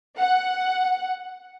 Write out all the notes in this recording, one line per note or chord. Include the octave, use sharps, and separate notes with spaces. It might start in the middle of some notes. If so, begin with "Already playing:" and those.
F#5